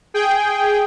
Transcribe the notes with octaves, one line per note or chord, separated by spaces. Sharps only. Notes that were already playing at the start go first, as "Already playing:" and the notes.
G#4 G5